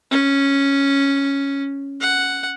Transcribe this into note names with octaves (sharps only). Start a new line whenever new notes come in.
C#4
F#5